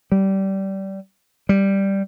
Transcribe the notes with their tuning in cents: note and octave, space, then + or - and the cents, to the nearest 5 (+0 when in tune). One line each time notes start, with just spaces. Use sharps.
G3 -20
G3 +0